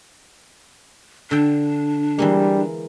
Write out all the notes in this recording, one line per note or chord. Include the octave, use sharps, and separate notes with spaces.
D3 D4 G5
E3 G3 G#3 A#3